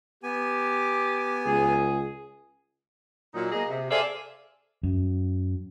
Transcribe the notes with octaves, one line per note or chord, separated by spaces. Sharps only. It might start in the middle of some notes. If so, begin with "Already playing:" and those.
B3 G4 G#5
C#2 G#4
A#2 F#3 D#4
A#3 G#4 D#5
C3
G#4 A4 C5 D5 E5 F5
F#2